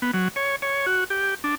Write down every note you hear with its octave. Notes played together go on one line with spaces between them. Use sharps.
B3
F#3
C#5
C#5
F#4
G4
D4